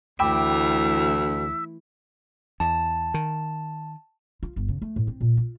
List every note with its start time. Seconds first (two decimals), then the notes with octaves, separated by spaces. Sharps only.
0.20 D2 E3 A3 E4 E5 G5 B5 D6
2.60 E2 A5
3.14 D#3
4.43 F4
4.56 G1
4.69 C#3
4.82 A3
4.96 A2
5.07 C4
5.21 A#2
5.37 F4